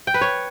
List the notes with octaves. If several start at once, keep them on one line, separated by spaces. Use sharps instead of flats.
G5
B4
C#5